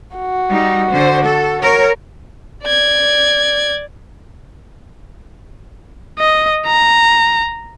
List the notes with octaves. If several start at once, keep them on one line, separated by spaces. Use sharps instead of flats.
F#4
G3 D#4
D3 C5
A4
A#4 C#5
D5 G#6
D#5
A#5